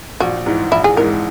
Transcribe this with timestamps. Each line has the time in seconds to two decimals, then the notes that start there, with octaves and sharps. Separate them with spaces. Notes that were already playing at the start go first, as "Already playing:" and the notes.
0.20 A#1 F#4
0.46 G#2 E3 G#3
0.71 A#1 E4
0.84 G#4
0.97 G#2 E3 G#3 A#4